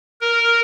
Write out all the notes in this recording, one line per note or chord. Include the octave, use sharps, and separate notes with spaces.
A#4